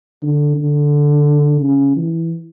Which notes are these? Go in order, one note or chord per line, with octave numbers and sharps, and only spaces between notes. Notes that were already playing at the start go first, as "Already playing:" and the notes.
D3
D3
C#3
E3